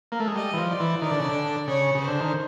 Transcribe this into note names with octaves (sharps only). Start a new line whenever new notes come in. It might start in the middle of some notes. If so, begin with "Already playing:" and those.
A#3
A3
G#3
G3 D#5
E3
F3
D5
E3
D#3 D5
D3
C#3
D3
C#3 C#5
C#3
C5
D3
D#3